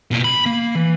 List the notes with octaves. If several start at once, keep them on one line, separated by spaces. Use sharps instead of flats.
B2 A#3
B5
A#3
E3